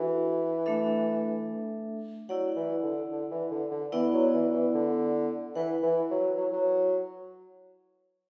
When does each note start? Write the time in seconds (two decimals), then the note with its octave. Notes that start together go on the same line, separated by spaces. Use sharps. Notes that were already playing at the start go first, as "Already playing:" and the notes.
Already playing: E3 D4 F#4 A4 F#5
0.66 A3 D4 A4 E5
2.29 F#3 E4 D5 F#5
2.56 E3
2.83 D3
3.11 D3
3.31 E3
3.51 D3
3.71 D3
3.92 E3 B3 E4 D5 F#5
4.13 F#3
4.34 E3
4.54 E3
4.74 D3
5.55 E3 E4 B4 F#5
5.83 E3
6.11 F#3
6.38 F#3
6.53 F#3